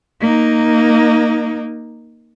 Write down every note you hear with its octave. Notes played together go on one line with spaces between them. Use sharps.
A#3 D#4